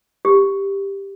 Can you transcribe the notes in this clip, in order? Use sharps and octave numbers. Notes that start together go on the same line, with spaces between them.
G4